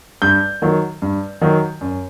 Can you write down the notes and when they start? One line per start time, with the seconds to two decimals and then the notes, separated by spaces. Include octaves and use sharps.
0.22 G2 G6
0.62 D#3 F#3
1.02 G2
1.41 D#3 F#3
1.81 F#2